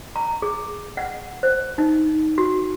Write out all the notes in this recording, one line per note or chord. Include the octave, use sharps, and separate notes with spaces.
A#5
G#4
F#5
C5
D#4
F#4